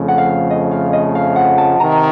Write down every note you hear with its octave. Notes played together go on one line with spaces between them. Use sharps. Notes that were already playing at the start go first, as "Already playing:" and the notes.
Already playing: F2 C#3 F3 A3
F#5
F5
D#5
F5
D#5
F5
F#5
A5
C3 D#3 A#5